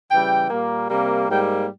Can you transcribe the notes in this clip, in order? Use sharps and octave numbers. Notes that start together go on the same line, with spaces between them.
C#3 E3 G3 G5
A#2 G3 A#3
C3 G3 A#3
G#2 G3 A#3 G5